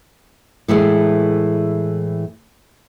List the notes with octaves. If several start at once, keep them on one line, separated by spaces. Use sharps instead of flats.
A2 E3 G#3 A3